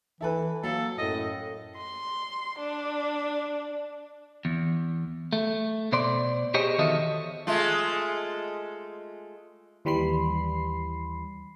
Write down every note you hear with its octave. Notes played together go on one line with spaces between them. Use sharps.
E3 E4 A4 B4
F#3 A#3 A4
F#2 A2 D#5
C6
D4
E2
A3
B2 C5 D5 C6
G4 G#4 C5 C#5 D#5 G#5
E2 D#3 F#4 A4 D#5 E5
G#3 A3 F4
D#2 E3 G3 B5 C6 C7